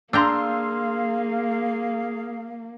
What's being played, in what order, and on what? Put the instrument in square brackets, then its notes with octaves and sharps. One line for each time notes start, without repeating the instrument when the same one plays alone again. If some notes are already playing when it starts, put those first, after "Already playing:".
[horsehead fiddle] A#3 [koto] D4 G5 A#5 [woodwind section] G#4 F5 [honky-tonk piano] C6 E6